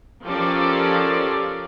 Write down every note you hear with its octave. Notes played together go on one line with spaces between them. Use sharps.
F3 C#4 G4 A4 A#4 D5